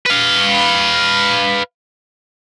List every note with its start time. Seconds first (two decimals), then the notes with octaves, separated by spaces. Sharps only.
0.06 B4 F5